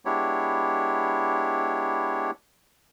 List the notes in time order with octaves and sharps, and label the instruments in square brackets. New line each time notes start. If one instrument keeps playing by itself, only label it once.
[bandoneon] G#3 B3 D4 E4 G4 C#5